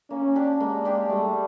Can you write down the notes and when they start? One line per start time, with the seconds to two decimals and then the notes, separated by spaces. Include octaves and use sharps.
0.10 A#3 C#4
0.35 D4 G4
0.60 G#3 A#3
0.85 D4 G4
1.10 G3 A3